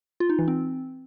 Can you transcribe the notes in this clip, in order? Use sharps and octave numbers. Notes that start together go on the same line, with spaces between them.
F4
D#4
E3
C4